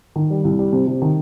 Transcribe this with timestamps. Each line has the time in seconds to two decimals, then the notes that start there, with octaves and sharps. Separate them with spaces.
0.16 D#3
0.30 G3
0.44 C2
0.59 G3
0.73 C3
0.87 C3
1.02 D#3